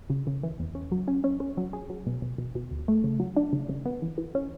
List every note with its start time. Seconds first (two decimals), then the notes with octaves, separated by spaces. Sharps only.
0.10 C#3
0.27 C#3
0.43 E3
0.60 E2
0.75 C#4
0.92 F#3
1.08 C#4
1.24 C#4
1.40 C#4
1.57 F#3
1.73 G#4
1.90 F#3
2.07 B2
2.22 B2
2.38 B2
2.55 B2
2.71 D2
2.88 A3
3.04 C#3
3.20 F#3
3.36 D4
3.53 C#3
3.69 C#3
3.85 B3
4.02 E3
4.18 E3
4.35 C#4